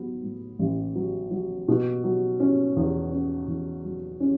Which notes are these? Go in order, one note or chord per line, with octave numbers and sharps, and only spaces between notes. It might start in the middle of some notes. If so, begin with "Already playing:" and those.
Already playing: F#3 B3
A2
A1
F#3
F#3
B2
F#3
C#4
E2
C#4
E2
F#3
C#4